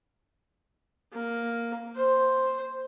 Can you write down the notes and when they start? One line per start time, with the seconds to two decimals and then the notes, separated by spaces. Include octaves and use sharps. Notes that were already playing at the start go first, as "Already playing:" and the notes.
1.13 A#3
1.96 C5